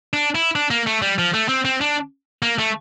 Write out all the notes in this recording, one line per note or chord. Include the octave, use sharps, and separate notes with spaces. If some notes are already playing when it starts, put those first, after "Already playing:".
D4
E4
D4
A#3
A3
G3
F3
A3
C4
C4
D4
A#3
A3